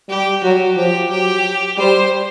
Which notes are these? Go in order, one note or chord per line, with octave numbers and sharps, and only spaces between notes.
G3 G4
F#3 F#4
F3 G4
F#3 G4
G3 C5